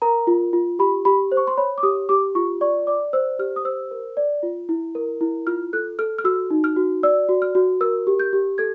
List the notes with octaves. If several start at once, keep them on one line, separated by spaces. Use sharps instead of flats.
A#4 A#5
F4
F4
G4 B5
G4 B5
C5
C#6
C6
C#5 B5
D6
G4 D#6
G4 D6
F4 C#6
D5 C#6
D5 D6
C5 E6
G4 F6
D#6
C5 E6
A#4
D5
F4
E4
A#4
E4
F4 F6
A4 F#6
A4 F6
F6
F#4 E6
D#4
F6
F#4
D5 E6
F#4
F6
F#4
A#4 E6
G4
G6
G4
A4 G#6